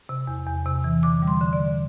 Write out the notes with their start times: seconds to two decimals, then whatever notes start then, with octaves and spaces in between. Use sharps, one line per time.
0.09 C3
0.27 E2
0.46 E2
0.66 C3
0.84 E3
1.03 D3 D6
1.22 G3
1.28 C6
1.41 D3
1.53 D5
1.60 D3